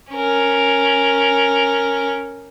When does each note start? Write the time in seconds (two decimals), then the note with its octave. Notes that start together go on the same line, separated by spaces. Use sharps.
0.12 C#4 A#4